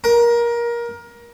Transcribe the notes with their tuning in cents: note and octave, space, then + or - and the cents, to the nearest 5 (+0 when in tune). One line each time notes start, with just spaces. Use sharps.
A#4 +20